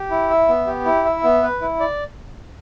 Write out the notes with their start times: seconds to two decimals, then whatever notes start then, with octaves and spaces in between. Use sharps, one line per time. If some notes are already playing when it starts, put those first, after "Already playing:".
Already playing: G4
0.11 E4
0.30 E5
0.48 B3
0.67 G4
0.85 E4
1.05 E5
1.23 B3
1.43 B4
1.61 E4
1.80 D5